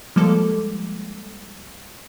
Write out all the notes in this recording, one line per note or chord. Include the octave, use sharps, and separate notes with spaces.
F3 G3 G#3 A#3 A4 D6